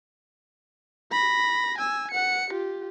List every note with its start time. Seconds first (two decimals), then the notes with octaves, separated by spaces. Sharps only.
1.12 B5 A#6
1.78 G#5 E6
2.11 F#5 C#7
2.50 F4 G4